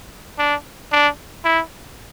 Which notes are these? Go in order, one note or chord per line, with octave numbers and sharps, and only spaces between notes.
D4
D4
E4